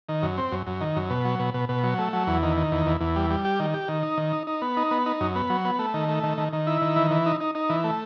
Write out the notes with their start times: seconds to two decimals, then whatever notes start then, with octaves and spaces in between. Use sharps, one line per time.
0.09 D#3
0.23 F#2
0.37 C4
0.52 F#2
0.67 F#2
0.81 D#3
0.96 F#2
1.10 B2
1.25 F#3
1.39 B2
1.54 B2
1.69 B2
1.84 F#3
1.98 A3
2.13 F#3
2.27 E2
2.43 D#3
2.57 D#3
2.72 E2
2.86 E2
3.00 E2
3.16 G3
3.30 G3
3.45 G4
3.60 D#3
3.74 G4
3.88 D#3
4.03 D#4
4.18 D#3
4.33 D#4
4.47 D#4
4.62 B3
4.77 D#4
4.91 B3
5.06 D#4
5.21 F#2
5.35 B3
5.50 F#3
5.65 B3
5.79 A3
5.94 D#3
6.08 A3
6.23 D#3
6.38 D#3
6.53 D#3
6.67 E4
6.82 D#3
6.96 E3
7.11 E3
7.26 D#4
7.40 D#4
7.55 D#4
7.70 E3
7.84 A3